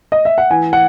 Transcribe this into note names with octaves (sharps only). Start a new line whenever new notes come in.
D#5
E5
F#5
E3 G#5
F#5